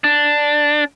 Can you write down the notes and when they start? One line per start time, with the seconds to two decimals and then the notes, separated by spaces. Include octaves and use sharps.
0.04 D4